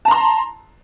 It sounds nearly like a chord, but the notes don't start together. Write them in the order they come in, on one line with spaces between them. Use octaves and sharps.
A5 A#5 C6